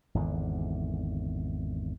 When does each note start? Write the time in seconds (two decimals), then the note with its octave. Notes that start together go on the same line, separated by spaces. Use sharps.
0.15 G#1 E2 D3